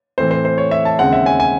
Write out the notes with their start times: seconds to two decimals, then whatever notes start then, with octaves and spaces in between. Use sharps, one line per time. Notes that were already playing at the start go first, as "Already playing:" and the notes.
0.18 A2 E3 A3 C4 C5
0.31 C5
0.45 C5
0.58 C#5
0.71 E5
0.85 A5
0.99 D#2 C#3 G#3 C4 F#5
1.13 E5
1.26 G#5
1.40 G#5